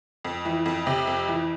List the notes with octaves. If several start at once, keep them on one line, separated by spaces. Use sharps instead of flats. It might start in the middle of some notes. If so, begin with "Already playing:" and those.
F2
E3
F2
C3
F2
E3